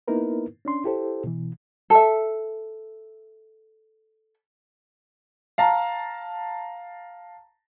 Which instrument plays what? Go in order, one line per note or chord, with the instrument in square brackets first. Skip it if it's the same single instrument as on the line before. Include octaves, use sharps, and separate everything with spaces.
[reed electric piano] A#3 B3 D#4 E4 A#4 B4
C#4 D4 C6
E4 G4 A4 C5
B2 E3
[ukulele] A4 E5
[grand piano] F5 A5 A#5